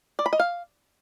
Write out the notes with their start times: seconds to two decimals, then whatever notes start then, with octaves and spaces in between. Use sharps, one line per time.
0.19 D5
0.26 B5
0.33 D#5
0.40 F5